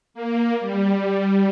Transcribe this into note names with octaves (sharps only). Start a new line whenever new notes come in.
A#3
G3